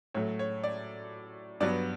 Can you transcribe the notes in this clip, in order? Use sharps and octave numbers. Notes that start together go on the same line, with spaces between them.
A2 F#3 A3 C#5
C#5
D5
G2 F#3 B3 D5